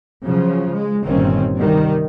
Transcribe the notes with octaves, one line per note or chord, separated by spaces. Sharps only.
C#3 F3 F#3
G#3
G1 A#2 D#3 C4 C#4
C2 D#3 G3